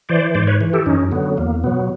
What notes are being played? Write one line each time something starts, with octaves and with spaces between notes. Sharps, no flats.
E3 C5 D5
G#2 C5 D5
B4 C#5
E3
G4 A4
F#2 C#4 D#4
D3 F#3 B3
E2 A#3
B2 F#3 B3